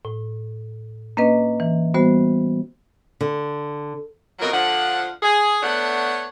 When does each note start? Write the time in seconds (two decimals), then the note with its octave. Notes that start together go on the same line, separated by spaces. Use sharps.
0.05 A2
1.17 A#3 C#4 D4 B4 D#5
1.60 E3
1.94 G3 B3 F#4 C5
3.21 D3
4.39 F2 B2 F3 F#3 A#4 D#5
4.52 D3 F3 F#5
5.22 G#4
5.62 A3 B3 D4 C#5 F#5